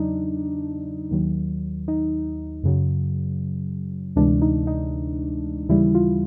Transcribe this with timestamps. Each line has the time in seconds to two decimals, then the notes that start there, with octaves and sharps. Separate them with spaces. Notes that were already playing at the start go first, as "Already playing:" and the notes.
Already playing: E2 C#3 F#3 D4 D#4
1.11 D#2 D#3 F#3
1.88 D#4
2.63 F#2 C#3 F#3
4.16 D2 C3 E3 G#3 D4
4.42 D#4
4.67 D#4
5.69 D#2 C#3 E3 G3 E4
5.95 F4